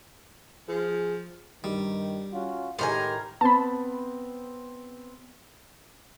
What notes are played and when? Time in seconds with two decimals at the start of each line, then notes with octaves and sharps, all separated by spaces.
0.69 F3 G#4
1.64 G2 D#3 G3
2.33 C#4 F4 F#4
2.79 A2 D#3 G#3 G4 A#4 C5 G#5
3.41 B3 C4 A5 B5